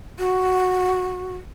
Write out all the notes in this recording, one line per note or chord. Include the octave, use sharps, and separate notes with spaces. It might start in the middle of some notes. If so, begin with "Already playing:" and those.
F#4